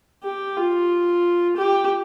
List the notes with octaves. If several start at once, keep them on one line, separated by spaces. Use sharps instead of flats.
G4
F4
G4